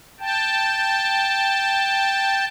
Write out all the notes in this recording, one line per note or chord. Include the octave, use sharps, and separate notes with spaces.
G5 A5